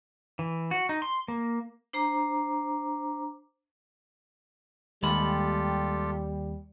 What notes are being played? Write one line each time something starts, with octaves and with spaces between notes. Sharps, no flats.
E3
F#4
D#4
C6
A#3
D4 C5 A#5 D6
D#2 G3 G#3 F4 G4 A4 B5